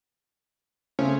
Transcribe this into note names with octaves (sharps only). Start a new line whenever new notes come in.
C#3 A3 C4 C#4